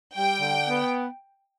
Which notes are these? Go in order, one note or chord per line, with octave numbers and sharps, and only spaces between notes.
G3 G5
D3
B3